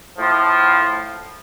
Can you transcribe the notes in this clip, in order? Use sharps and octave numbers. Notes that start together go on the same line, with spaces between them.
A2 F3